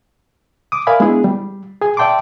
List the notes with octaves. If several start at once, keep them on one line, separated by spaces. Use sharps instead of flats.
D6 D#6
A#4 D5 E5 F5 G#5 B5
G#3 B3 D4 E4 G#4
G3
G#4 G#5
D5 E5 G5 A5 C6 D6